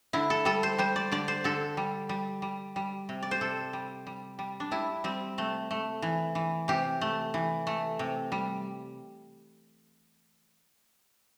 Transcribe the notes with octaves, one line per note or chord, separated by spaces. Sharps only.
D3 E4
A4
G3 A4
C5
G3 C5
D5
D3 D5
C5
D3 A4
G3
G3
G3
G3
C3
D5
C5
C3 A4
G3
G3
G3
D4
G3 E4
G3 C4
C3 A3
A3
E3
E3
C3 G4
A3
E3
A3
C3
G3